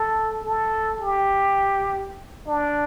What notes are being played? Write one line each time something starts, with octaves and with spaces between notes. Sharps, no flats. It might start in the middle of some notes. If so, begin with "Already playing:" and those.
Already playing: A4
A4
G4
D4